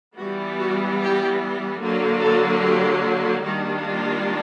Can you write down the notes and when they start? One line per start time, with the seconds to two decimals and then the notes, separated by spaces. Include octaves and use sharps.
0.18 E3 G3 B3 F#4
0.59 F#4
1.00 G4
1.81 D3 F#3 A#3
2.22 A4
2.63 G4
3.44 D#3 G3 A#3 D4 F#4
3.86 F4